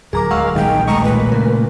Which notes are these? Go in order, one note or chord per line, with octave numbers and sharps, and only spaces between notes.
D1 D#2 F#3 G#4 A#4 A#5 D6
G#3 F5 F#5 C#6 E6
D#1 B1 D#3 G#3 G5
D#3 G#3 A3 D#5 A#5 C#6
A#2 B4
C#3 A3 A#4